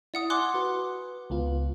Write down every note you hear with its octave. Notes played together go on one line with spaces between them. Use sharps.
E4 D5 F#5 D#6
G#5 C6 D6 F#6
F#4 B4
C#2 B3 F4